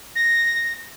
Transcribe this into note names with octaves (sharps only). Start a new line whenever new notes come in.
A#6